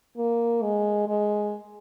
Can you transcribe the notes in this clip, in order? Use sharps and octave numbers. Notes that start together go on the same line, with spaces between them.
A#3
G#3
G#3